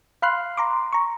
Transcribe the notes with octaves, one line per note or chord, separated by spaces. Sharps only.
F5 B5 C6 F6 F#6 C7
A#5 C6 D6
A#5 C#6